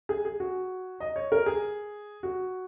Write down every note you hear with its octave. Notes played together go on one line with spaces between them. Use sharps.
G#4
G#4
F#4
D#5
C#5
A#4
G#4
F#4